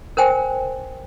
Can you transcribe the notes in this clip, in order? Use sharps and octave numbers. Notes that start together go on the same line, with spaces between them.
A#4 C5 G5 G#5